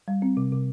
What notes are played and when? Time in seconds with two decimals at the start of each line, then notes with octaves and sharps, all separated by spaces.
0.08 G3
0.22 C4
0.37 C3
0.52 C3